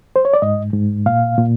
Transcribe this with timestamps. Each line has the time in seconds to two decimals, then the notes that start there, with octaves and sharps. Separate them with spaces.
0.16 C5
0.25 C#5
0.34 D5
0.42 G#2 D#5
0.73 G#2
1.06 A#2 F5
1.38 A#2